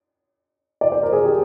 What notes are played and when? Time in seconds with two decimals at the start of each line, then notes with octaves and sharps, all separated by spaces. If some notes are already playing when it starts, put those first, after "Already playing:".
0.81 D5
0.92 C5
1.03 A#4
1.13 G#4
1.25 G4